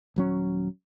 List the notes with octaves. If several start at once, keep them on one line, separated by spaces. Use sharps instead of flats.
D#1 F#3 C#4